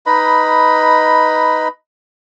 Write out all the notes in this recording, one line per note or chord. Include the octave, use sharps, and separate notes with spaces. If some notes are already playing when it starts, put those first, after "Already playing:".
D#4 B4 D#5 B5